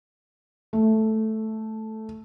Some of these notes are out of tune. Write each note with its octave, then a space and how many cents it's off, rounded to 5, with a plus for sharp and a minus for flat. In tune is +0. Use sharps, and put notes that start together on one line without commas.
A3 -5